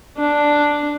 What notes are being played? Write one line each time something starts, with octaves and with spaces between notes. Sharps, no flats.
D4